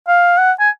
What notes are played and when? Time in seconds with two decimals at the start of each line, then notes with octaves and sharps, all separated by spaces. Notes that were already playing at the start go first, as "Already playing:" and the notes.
0.08 F5
0.38 F#5
0.60 G#5